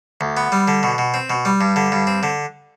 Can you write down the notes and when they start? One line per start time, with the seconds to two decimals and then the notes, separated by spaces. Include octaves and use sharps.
0.21 D2
0.37 B3
0.52 G3
0.68 D3
0.83 B2
0.98 B2
1.14 C4
1.30 B2
1.45 G3
1.61 G2
1.76 D3
1.92 G2
2.07 C4
2.23 D3